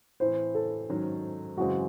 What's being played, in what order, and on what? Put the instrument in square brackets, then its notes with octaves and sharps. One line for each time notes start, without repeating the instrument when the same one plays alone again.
[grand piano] A2 E3 C4 [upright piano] C5
[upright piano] A4
[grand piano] G#2 D#3 F#3 C#4
[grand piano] F#2 C#3 E3 G#3 C4 [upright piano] F#4